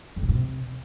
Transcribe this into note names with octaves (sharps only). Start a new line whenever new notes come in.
F2
C#3
G2
C3